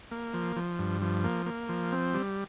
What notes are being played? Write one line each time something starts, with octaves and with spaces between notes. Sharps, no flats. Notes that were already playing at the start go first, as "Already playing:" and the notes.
A#3
F3
F3
G2
F3
A#3
A#3
F3
C4
G3